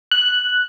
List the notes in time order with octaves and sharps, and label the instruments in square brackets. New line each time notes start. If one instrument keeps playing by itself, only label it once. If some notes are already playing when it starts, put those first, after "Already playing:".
[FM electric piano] F#6